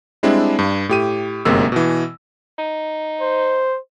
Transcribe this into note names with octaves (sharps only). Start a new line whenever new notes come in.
G3 G#3 C4 D4 E4
G2
A2 G4 D#7
G1 F#2 C3 G#3 A#3 E6
B2 E3
D#4
C5